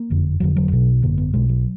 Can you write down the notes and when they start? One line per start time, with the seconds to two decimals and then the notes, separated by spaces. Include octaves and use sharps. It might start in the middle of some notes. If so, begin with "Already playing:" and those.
Already playing: A#3
0.10 F#1 F2 D3
0.40 F1 F2 D3 F#3
0.56 F#3
0.71 B1 B2
1.02 G#1 F#2 D3 A#3
1.18 B3
1.33 B1 B2 G#3
1.49 F#3